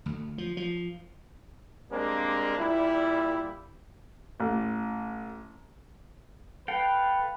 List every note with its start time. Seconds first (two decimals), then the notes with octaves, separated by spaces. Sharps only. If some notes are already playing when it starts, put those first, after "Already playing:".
0.06 D2
0.38 F3
0.57 F3
1.91 G3 G#3 A#3 C4 D4
2.57 A#2 G3 E4
4.40 A1
6.68 A4 B4 F5 G5